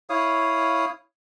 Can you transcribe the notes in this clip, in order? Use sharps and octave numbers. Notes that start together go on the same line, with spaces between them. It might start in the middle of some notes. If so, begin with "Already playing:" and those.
E4 C#5 F5 D#6